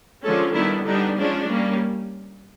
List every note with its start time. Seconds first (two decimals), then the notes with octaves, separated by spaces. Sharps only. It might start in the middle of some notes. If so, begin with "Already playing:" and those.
0.24 D3 F3 G#3 C#4 A4
0.54 D#3 G3 B3 D4 E4
0.85 D3 G3 B3 D4 D#4
1.17 F3 G#3 C#4 D4
1.47 G3 A#3 C#4